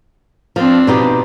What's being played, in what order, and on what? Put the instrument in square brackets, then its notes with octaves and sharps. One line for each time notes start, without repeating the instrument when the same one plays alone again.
[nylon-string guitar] F3 [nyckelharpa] C4 D4
[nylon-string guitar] B2 D#4 G4